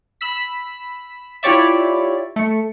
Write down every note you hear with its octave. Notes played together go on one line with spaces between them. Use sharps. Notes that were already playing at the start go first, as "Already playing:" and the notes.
B5 E6 B6
E4 F4 G4 C#5 D5 E5
A3 C#7